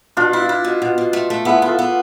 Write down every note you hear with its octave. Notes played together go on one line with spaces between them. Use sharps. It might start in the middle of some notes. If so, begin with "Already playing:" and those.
B2 D4 F4
E4
E4
B2
B2
B2
A3
A3
B3 E4 G#4
B3
F4 A4
B3